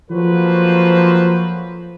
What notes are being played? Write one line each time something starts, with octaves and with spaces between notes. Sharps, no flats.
F3 F#3 A#3 A4 B4 C5